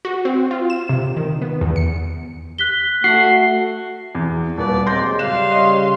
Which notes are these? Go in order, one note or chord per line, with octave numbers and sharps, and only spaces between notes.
F#4
C4
F4
E7
C3
D#3
B3
E2
C#7
F#6 B6 G7
A3 F#4 C7
E2
D#1 B4 D5
C3 F#3 G#3 C6 G6 A#6
C#3 G3 F5 C6 F#6 E7
C#5 D#5